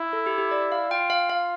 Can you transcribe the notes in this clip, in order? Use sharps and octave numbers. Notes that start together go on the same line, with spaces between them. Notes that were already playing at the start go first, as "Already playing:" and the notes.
Already playing: E4
A4
G4
G4
D5
F5
F4 G5
F5
F5